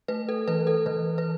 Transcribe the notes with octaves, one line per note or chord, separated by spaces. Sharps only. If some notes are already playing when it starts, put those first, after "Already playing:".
A3 B4
A4
E3 B4
A4
E3 B4
B4